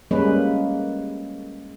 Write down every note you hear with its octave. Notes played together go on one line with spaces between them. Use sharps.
G3 G#3 A#3 C#4 B4